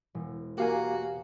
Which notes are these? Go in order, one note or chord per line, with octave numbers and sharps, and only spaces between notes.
E1
A#3 F#4 G4 F5 G#5